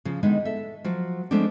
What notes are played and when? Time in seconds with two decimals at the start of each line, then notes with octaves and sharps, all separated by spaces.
0.05 C#3 F3
0.23 D3 D#3 G#3 B3 D#4
0.45 A4 E5
0.84 F3 F#3 F#4
1.31 F3 G#3 A3 B3 C4 D4